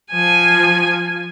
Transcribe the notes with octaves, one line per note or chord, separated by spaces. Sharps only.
F3 G#5